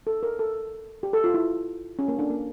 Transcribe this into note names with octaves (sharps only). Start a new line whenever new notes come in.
A4
A#4
A4
G4
A4
F4
E4
C#4
A#3
D4
A#3